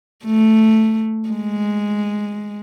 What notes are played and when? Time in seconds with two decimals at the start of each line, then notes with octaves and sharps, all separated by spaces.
0.25 A3
1.29 G#3